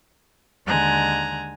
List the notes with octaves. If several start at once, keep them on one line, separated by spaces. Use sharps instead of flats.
D#2 D3 G#3 G#5 A#5 F#6